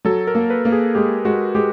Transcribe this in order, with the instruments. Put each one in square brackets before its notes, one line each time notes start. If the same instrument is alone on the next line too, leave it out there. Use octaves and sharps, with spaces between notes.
[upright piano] F#3 [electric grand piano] A4
[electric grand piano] A#4
[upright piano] A#3
[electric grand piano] B4
[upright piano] A#3
[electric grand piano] G#4
[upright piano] G#3 [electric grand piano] G4
[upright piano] G#3 [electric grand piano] F#4
[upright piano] G#3 [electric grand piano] G4